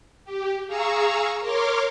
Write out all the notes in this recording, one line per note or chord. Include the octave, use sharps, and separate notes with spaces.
G4
G#4 F5 A#5 C#6 E6
A#4 C#5 C6 D6 F6